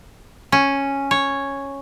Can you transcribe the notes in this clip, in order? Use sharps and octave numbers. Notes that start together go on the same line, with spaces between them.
C#4
C#5